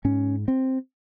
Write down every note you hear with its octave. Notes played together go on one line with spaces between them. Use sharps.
G#2 C#4
C4